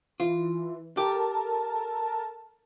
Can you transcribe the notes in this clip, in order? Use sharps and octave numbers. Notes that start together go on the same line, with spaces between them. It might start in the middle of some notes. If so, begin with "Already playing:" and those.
E3 F4
G4 A4 A#4 A5